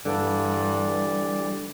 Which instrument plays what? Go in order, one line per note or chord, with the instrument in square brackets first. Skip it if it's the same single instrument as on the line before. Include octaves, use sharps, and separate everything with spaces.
[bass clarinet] G2 [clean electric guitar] D3 [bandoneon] E3 D5 [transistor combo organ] G3